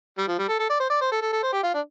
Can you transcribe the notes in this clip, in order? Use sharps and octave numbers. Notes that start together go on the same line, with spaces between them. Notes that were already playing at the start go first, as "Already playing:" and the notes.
G3
F3
G3
A4
A4
D5
C5
D5
C5
A4
A4
A4
C5
G4
F4
D4